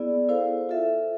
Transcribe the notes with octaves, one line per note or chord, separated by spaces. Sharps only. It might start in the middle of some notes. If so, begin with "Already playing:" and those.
Already playing: B3 E4 G#4 D5
E4 A4 C5 F5
F4 A4 E5